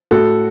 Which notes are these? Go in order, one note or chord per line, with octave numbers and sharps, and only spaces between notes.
A2 F#4 A4